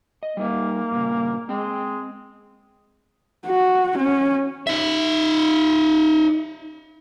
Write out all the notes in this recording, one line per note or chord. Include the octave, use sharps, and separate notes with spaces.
D#5
G3 A#3 D#4 E5
G2 A#2 C#3
G#3 C4 G5
F#4
C#4
D#4 E5